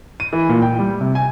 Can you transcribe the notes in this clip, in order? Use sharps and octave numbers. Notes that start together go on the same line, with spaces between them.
D#7
E3
A#2
G5
G3
C3
G#5